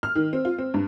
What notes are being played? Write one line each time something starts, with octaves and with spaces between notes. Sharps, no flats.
F6
D#3
C4
F4
C4
G2